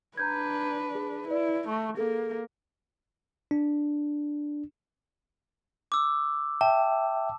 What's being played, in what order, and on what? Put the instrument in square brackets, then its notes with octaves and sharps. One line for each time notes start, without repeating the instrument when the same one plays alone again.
[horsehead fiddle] D4 B4 [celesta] A#5 G6 G#6
[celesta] G#4
[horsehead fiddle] E4 [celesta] B4 D5
[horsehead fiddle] A3 [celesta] C#6
[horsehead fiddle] A#3 [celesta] G#4 A4
[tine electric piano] D4
[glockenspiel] D6 E6
[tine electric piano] E5 G5 [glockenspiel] A5